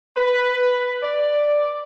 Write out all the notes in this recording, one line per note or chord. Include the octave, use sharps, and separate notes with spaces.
B4
D5